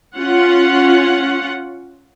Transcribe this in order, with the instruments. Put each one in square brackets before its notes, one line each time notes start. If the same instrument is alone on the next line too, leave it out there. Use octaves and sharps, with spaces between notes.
[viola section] C#4 F4 F#5